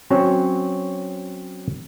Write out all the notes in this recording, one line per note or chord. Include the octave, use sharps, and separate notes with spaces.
F#3 C4 C#4 F#4 C#5